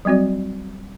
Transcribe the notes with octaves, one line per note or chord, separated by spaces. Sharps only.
F#3 G3 C4 F#4 D5